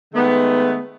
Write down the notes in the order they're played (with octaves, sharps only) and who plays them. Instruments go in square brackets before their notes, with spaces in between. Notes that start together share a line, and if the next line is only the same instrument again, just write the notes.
[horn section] D#3 G#3 A3 B3